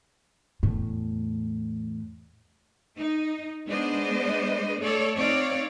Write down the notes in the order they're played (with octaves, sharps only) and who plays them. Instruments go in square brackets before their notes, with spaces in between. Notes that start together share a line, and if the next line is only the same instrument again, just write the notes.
[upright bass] E2 A2
[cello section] D#4
G#3 B3 D4 C5 D5 D#5
A3 A4 C#5 D5
C4 D#4 C#5 D5 F5